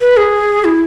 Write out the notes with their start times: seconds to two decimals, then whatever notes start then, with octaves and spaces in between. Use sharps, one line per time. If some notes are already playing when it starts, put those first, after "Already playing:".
0.01 B4
0.17 G#4
0.65 E4